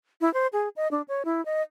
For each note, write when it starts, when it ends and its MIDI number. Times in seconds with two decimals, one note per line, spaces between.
0.21 0.32 64
0.34 0.47 72
0.53 0.69 68
0.76 0.88 75
0.91 1.02 62
1.08 1.23 73
1.25 1.44 64
1.45 1.62 75